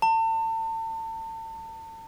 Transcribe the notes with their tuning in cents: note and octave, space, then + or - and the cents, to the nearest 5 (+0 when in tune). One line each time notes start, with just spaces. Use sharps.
A5 +35